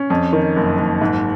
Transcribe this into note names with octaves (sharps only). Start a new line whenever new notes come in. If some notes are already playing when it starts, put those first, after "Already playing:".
Already playing: C#4
F2
D#3
F#1
F#1
G#2